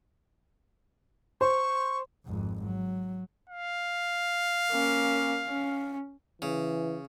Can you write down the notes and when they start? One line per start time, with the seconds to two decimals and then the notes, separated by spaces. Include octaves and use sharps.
1.41 C5 C#6
2.25 G#1 F2
2.65 F#3
3.50 F5
4.71 A#3 C#4
5.47 C#4
6.42 C#3 E3